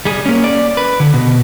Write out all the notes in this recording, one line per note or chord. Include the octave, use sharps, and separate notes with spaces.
G3 G#4
A#3 C#4
D5
B4
D3
B2